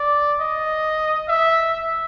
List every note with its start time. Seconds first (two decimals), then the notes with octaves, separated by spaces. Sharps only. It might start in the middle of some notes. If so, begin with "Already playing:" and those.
Already playing: D5
0.41 D#5
1.28 E5